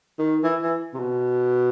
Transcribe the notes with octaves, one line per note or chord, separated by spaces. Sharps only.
D#3
E3
E3
C3
B2